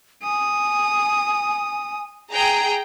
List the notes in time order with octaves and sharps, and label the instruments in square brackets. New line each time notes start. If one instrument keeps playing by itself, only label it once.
[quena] G#5 [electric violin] D#6
[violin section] G#4 G5 A#5